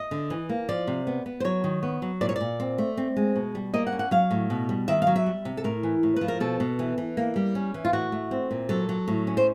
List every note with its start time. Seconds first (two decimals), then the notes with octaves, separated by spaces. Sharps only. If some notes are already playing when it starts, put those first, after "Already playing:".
Already playing: D#5
0.11 D3
0.30 E3
0.49 A#3
0.69 F3 D5
0.87 C3
1.07 B3
1.26 B3
1.40 C5
1.44 F#3 C#5
1.64 D#3
1.83 B3
2.02 F#3
2.21 A#2 D5
2.29 C#5
2.36 A#2 D5
2.60 C4
2.78 A3
2.97 C4
3.16 G#3
3.36 B2
3.55 G3
3.74 A#3 D#5
3.87 F#5
3.92 C#4
3.99 F#5
4.11 F#3 F5
4.31 A2
4.50 B2
4.69 G3
4.88 D#3 E5
5.02 F5
5.07 F#3
5.16 E5
5.26 G3
5.45 C3
5.57 A4
5.64 A2 A#4
5.83 E3
6.03 A2
6.16 F3 B4
6.28 A#4
6.40 B2 A4
6.60 B2
6.79 E3
6.98 E3
7.17 A#3
7.36 G3
7.55 C#4
7.74 E3
7.85 F4
7.93 A2 F#4
8.12 A3
8.31 C4
8.51 A#2
8.69 F#3 A4
8.89 F#3
9.08 A2
9.27 C#4
9.37 C5